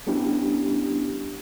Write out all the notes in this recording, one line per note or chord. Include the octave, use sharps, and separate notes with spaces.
G3 B3 C#4 D4 E4 G4